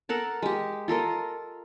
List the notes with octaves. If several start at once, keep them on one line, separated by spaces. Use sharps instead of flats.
A4 A#4 F#5 A5
G#3 G4
F4 A4 A#4 D#5